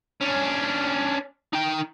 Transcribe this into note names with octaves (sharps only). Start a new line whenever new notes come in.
C#4 D4
D#4 G5